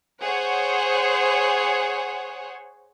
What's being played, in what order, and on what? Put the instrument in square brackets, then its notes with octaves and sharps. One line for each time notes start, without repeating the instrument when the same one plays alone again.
[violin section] G#4 C5 C#5 F#5